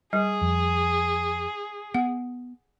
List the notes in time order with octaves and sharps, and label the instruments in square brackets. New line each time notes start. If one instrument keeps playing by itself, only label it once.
[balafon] G3 [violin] G#4
[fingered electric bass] F2
[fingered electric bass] B3 [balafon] F#5